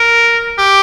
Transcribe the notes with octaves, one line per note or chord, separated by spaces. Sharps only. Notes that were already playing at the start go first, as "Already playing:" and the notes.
Already playing: A#4
G4